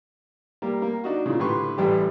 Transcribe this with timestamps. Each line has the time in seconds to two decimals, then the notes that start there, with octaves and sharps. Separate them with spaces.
0.62 G3 A#3 G4
0.82 A#3
1.04 D4 D#4 F#4
1.26 A#2 C#3
1.40 A2 D3 G4 B4 C6 C#6
1.78 A1 A2 E3 G3 G4